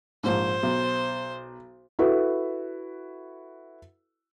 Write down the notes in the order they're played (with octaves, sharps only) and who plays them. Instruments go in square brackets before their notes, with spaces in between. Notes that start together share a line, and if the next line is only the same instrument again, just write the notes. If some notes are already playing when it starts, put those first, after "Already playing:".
[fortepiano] A#1 G#2 [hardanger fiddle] C5
[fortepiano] B1
[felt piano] E4 F#4 A4 B4